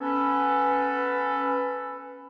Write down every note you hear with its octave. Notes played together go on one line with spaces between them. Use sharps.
B3 C#4 A4 B4